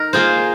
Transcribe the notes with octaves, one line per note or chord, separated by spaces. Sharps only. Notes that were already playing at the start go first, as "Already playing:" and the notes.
Already playing: D#4 A#4
A#3 F4 G#4 C5